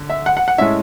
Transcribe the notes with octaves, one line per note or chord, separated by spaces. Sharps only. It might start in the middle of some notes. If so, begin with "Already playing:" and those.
Already playing: D3
E5
F#5
F#5
F#5
A2 G#3 C#4 E5